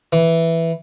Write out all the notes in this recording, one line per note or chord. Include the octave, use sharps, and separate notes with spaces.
E3